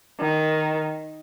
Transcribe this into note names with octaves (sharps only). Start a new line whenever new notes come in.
D#3